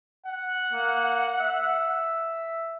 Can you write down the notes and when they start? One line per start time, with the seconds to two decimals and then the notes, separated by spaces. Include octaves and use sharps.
0.26 F#5
0.72 A#3
1.40 E5